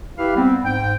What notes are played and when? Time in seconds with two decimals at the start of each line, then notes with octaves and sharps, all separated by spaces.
0.18 E4 G4 B4 F5
0.36 G3 B3 C4
0.64 G#2 G5